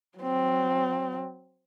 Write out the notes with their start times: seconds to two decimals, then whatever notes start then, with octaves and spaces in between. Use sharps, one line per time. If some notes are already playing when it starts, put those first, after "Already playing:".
0.18 F#3 C4